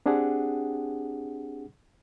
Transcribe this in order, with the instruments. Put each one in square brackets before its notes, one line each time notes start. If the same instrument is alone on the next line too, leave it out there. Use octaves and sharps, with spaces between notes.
[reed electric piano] C4 D4 G4 G#4 F#5